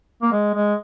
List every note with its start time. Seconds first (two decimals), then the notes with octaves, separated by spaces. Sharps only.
0.22 A#3
0.32 G#3
0.55 G#3